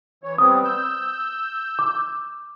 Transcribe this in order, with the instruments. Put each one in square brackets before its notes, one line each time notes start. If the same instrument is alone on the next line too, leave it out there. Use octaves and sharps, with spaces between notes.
[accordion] E3 C#5
[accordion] G3 B3 C4 [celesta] D#6
[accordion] E6 G6
[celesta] D6